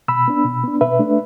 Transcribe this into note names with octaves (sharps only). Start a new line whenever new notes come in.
B2 B5 E6
B3 D4
B2
B3 D4
B2 B4 E5
A3 D4